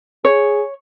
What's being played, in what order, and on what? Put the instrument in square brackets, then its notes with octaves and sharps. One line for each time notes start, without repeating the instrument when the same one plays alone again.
[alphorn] G#4 [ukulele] C#5